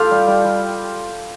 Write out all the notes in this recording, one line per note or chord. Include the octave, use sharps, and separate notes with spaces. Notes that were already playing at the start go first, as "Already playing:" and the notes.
Already playing: F4 G4 A4 F5 G5
G3
G3
G3